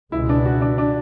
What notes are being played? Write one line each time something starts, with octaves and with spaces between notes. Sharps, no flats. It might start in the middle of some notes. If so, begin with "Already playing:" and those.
C#2 B2 G#3 B3 E4
D4
F#4
D4
D4